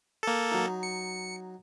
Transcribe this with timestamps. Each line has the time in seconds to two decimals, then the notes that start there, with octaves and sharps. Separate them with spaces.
0.23 A#3 A4
0.52 F#3 D#4
0.83 C#7